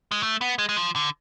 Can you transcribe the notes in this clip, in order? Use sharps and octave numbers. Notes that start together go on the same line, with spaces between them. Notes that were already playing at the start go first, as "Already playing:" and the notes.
G#3
A3
B3
G#3
G#3
F3
D3